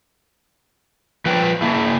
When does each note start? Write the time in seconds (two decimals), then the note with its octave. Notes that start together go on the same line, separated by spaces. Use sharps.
1.26 F3 B4 G5
1.62 A#3 E4